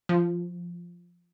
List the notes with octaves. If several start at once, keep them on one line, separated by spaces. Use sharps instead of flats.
F3